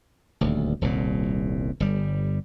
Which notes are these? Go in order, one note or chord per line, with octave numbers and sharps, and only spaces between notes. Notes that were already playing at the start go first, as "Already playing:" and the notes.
D#1 D2
D#1 C2 A#2
G1 G3